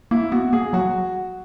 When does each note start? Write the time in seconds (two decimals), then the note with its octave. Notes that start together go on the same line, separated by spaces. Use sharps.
0.11 A#3 E4
0.32 B3 F#4
0.53 A#3 G#4
0.73 F#3 F#4